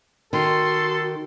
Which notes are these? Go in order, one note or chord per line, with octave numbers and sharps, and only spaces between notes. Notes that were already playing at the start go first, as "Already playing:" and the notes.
D#3 F#4 A4 C6